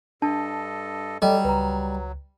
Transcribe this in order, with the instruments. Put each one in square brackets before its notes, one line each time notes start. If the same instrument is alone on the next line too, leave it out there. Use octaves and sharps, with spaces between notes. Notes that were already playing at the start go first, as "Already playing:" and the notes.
[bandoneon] G2 A4 D#5 [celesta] D4 A5
[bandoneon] F#3 [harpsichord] G3 [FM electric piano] A4 D5 [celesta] D#5
[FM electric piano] C#2 [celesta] B4 A#5